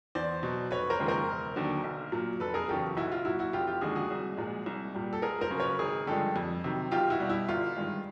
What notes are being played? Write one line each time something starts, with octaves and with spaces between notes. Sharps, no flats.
E2 C5 D5
B2 F#3
F1 B4 C#5
A#4 C5
D#2 C#3 F3 G#3
A#4 C5
E1
D#2 D3 F#3
B1
A#2 F#3
F1 A4 B4
G#4 A#4
E2 C#3 F#3 G4 A4
B1 E4 F#4
F4
A#2 F#3 E4 F#4
E4 F#4
F1 F4 G4
F4 G4
D#2 D3 F3 G#3 F#4 G#4
F#4 G#4
C2
A#2 F3 G#3
C2
A#2 G3
A4
C#2 G#4 A#4
A#4 C5
C#3 F#3
B4 C#5
G#1 G#4 A#4
G2 D3 F3 G#3 G4 A4
F2
C3 D#3 F#3
B1 F4 G4
E4 F#4
B2 G3
E4
G1 F4
G2 D#3 G#3